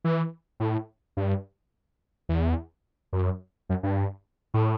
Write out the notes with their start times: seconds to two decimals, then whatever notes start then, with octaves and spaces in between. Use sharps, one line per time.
0.04 E3
0.60 A2
1.17 G2
2.29 E2
3.13 F#2
3.69 F#2
3.83 G2
4.54 A2